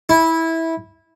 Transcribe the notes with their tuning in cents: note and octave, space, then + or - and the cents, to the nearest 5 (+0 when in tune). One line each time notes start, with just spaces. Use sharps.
E4 -15